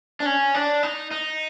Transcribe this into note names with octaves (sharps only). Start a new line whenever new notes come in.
D4
C#4
D4
D#4
D#4